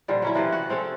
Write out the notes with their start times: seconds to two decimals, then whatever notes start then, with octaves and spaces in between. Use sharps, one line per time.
0.08 A#2 D3 F3 G3
0.22 F#3 C#4 E4
0.35 C3 E3 F3 B4
0.52 F#4
0.69 F3 C4 C#4 A4